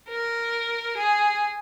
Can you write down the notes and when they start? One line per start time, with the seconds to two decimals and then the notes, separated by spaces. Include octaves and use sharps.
0.09 A#4
0.98 G#4